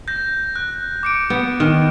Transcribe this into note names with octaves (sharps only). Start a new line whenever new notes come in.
G6 A#6
F#6
D6 C#7 D7
B3
D#3